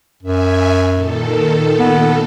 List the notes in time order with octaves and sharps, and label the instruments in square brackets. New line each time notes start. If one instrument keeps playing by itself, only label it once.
[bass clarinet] F#2 [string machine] E5 G#5
[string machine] A#2 D#3 A4
[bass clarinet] B3